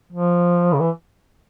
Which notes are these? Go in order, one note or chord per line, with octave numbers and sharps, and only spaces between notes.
F3
C#3
E3